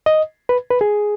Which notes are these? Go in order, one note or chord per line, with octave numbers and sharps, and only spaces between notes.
D#5
B4
B4
G#4